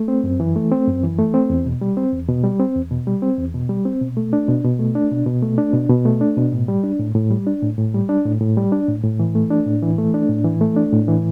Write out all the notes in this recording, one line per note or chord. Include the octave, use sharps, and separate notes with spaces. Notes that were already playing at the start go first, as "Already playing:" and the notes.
Already playing: A3
C4
F#2
E3
A3
C4
F#2
E3
A3
C4
E2
B2
G3
C4
E2
B2
G3
C4
E2
B2
G3
C4
E2
B2
G3
C4
B2
A3
D4
B2
B2
A3
D4
B2
B2
A3
D4
B2
B2
A3
D4
B2
A2
G3
D4
A2
A2
G3
D4
A2
A2
G3
D4
A2
A2
G3
D4
A2
A2
E3
A3
D4
A2
E3
A3
D4
A2
E3
A3
D4
A2
E3